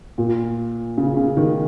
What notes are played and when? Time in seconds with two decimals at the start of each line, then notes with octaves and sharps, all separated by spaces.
0.18 A#2
0.98 C#3
1.17 C#3
1.37 D#3